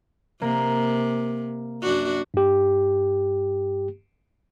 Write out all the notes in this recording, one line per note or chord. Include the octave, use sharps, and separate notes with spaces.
C3 A#3
F#2 D4 F#4
G2 G4